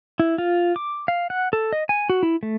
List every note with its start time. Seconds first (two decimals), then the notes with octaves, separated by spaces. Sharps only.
0.20 E4
0.38 F4
0.76 D6
1.08 F5
1.30 F#5
1.53 A4
1.73 D#5
1.89 G#5
2.10 F#4
2.23 E4
2.43 A3